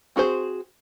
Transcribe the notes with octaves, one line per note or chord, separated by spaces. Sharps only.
C4 F#4 G#4 C5